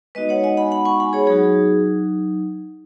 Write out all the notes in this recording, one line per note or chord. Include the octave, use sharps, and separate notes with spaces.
G#3 B3 D#4 F#4 B4 D#5
C#5 F#5
D#5 G#5
F#5 B5
F#5 B5
G#5 C#6
F#5 B5
G#4 C#5
F#3 D#4 F#4 G#4